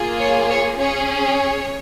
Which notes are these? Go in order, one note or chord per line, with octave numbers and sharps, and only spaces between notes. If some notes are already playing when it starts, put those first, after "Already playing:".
Already playing: A#3 F4 G#4
C#5
C#5
C#4 G#4 C#5
C#5